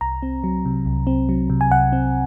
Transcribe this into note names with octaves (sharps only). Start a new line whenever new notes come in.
C2 A#5
C4
F#3
C3
C2
C4
F#3
C3
G#5
C2 F#5
C4